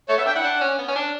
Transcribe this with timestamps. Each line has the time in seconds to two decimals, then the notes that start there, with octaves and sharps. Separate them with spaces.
0.09 A3 C#5
0.18 B3 E5
0.26 D4 G5
0.35 E4 F#5
0.44 D4
0.61 C#4
0.79 B3
0.88 C#4
0.96 D4